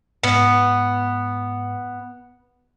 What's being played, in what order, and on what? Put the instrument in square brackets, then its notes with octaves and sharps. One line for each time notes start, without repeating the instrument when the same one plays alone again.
[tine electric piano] G#2 [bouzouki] B3